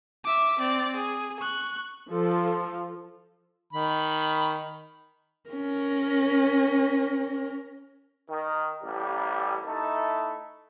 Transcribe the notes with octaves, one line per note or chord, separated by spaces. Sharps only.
E5 D6
C4 D5
G#4
C#6 F#6
F3 A4
D#3 B5
C#4 A#4
D#3
A1 G3
A3 D#4 E4 A4